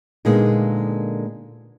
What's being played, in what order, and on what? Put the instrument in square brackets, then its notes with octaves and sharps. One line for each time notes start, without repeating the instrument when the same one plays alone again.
[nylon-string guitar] A#2 D3 G#3 A#3 B3 D#4